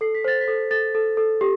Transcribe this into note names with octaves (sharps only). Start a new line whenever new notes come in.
A4 C7
B6
C5 A6
B6
A4
A4 A6
A4
A4
G4